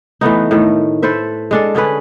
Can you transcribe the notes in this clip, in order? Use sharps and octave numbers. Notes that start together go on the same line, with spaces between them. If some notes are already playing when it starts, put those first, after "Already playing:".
E3 A3 B3 D#4
A2 D#3 A3
A4 B4 C5 E5
G#3 D4 A4
D3 C#4 G#4 B4